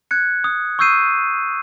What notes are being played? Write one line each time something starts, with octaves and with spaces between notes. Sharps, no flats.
F#6 G#6 C#7
D#6
C#6 D#6 E6 G6 C7 D#7